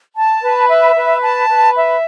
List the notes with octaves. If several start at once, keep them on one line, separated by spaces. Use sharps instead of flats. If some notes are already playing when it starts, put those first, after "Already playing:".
A5
B4
E5
B4
A5
B4
E5